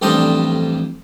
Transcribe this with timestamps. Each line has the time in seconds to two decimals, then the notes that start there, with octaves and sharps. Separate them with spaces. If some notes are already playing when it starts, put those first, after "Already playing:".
0.02 A1 F2 G3 D4 C5 D#5